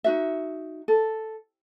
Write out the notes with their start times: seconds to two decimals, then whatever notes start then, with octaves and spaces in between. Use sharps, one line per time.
0.04 D#4 F#4 E5
0.88 A4